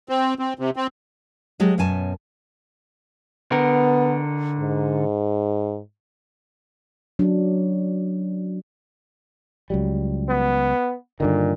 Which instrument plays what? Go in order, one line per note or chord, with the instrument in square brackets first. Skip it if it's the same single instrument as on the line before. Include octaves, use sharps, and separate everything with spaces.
[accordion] C4
C4
C3
C4
[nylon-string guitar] F#3 G#3 G4 A4
F#2 B2 C#5 G#5 A5
[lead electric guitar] D3 A#4 [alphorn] B3
[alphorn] G#2
[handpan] F#3 D4
[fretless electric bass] C#2 F#3 G3
[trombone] B3
[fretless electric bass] G2 D3 D#3 [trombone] A#2